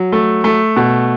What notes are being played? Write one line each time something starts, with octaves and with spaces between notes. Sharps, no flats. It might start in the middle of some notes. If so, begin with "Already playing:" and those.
Already playing: F#3
A3
A3
B2